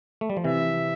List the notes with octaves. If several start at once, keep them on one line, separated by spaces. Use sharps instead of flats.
A3
G3
F3
C3 E3 E5